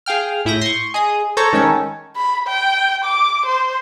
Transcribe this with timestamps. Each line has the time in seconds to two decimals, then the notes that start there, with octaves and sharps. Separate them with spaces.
0.06 G#4 F5 G5 F6
0.45 A2 E4 D#6 G6 A#6
0.61 C6 C#6
0.94 G#4 D#5 D#6
1.37 A4 C5 C#5 A#5 C#6
1.53 D#3 G#3 C#4 A4 C#5
2.16 B5
2.48 G5
3.05 D6
3.46 C5